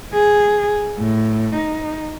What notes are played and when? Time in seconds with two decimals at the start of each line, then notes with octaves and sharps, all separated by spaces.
0.13 G#4
0.98 A2
1.55 D#4